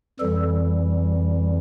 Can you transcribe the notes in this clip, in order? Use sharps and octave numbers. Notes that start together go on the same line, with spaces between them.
F2 E3 G3 A4